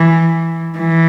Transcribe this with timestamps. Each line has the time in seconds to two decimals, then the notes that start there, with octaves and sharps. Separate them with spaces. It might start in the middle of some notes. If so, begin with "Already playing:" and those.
Already playing: E3
0.78 E3